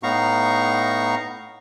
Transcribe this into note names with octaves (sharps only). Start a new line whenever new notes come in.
A2 B3 D#4 F5 A#5 C#6